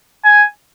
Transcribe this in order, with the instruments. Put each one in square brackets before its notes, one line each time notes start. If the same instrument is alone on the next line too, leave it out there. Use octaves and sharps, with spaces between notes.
[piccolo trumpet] G#5